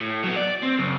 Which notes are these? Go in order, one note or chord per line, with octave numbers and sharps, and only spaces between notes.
A2
F#3 B3
D5
C4
F#2 C#3